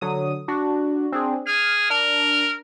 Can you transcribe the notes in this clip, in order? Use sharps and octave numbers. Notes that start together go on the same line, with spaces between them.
D3 F#3 D#6
D4 F#4
C4 D4 G#4
G#4 F6
D4 A#4